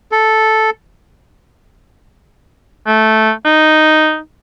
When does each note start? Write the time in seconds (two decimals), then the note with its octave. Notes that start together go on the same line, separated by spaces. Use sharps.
0.12 A4
2.87 A3
3.45 D#4